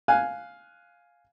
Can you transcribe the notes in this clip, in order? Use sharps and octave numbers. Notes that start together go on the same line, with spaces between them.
F5 G#5 F#6